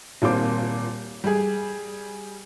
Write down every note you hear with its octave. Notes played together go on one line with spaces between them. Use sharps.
D#1 A#2 A#3 C4 D6
G3 G#4